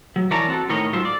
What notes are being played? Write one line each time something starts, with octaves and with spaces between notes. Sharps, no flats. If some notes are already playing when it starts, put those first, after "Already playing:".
F#3
E3 A#4 C#5 D5 A5 A#5
C4 F#4 A4
A2 D#3 A#4 C#5 D#5
G#2 F#3 F4 A4 C5
D5